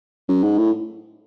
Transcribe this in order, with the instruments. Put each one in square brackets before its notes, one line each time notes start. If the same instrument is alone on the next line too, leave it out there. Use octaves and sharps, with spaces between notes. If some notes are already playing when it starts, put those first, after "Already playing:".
[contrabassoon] F#2
G#2
A2